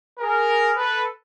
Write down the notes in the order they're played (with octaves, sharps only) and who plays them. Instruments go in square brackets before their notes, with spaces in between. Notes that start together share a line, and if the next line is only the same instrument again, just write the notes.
[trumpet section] G#4 A#4
A4 B4